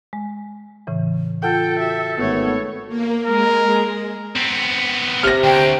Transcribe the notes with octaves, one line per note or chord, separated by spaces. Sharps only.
G#3
A2 C#3 E3
F4 A4 F#5 G5
F#4 E5
G#1 A3 B3 C#5
A#3
G#3 A#4
B3 C4
C3 F6 A#6
D2 G5